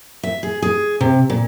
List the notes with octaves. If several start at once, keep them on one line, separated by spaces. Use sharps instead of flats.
E5
G#4
G#4
C3
A#2